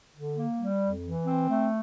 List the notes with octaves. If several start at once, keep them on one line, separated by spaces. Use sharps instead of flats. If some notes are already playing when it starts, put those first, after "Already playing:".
D3
A#3
G3
F2
E3
C4
A3